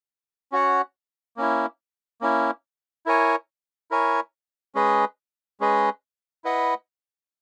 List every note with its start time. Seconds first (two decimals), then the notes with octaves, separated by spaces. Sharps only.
0.52 C#4 F#4 C#5 F#5
1.37 A#3 C#4 E4
2.21 A#3 C#4 E4
3.06 E4 A#4 C#5 G#5
3.91 E4 A#4 C#5 G#5
4.75 G#3 C#4 G#4 B4 D#5
5.60 G#3 C#4 G#4 B4 D#5
6.44 E4 B4 D#5 F#5